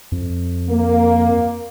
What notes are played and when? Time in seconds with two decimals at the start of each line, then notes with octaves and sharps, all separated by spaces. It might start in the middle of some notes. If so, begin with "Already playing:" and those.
0.12 F2
0.69 A#3